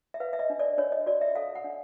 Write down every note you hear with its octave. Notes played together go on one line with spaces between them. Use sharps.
E5
B4 F5
E5
D#5
D4
D5
D4 C#5
D#5
F#4 D5
E5
A4 F5
F#5
D4